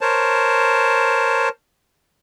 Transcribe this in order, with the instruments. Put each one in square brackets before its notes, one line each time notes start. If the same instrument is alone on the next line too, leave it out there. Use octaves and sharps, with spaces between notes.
[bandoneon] A#4 C5 C#5 A5